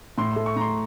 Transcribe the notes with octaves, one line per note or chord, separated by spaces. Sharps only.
A2 C6
A3 C6
C#6
A2 A#5 C6